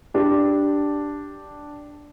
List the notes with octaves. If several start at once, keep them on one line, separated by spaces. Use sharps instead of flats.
D4 G4